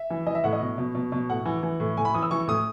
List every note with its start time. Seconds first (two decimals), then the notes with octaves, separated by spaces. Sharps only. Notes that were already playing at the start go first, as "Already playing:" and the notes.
Already playing: E5
0.10 E3
0.26 E3 D#5
0.35 E5
0.44 A2 F#5
0.53 D#5
0.60 B2
0.78 B2
0.95 B2
1.12 B2
1.30 A2 F#5
1.45 E3
1.63 E3
1.80 A2
1.97 A2 G#5
2.05 B5
2.14 E3 D#6
2.23 E6
2.31 E3 C#6
2.47 A2 D#6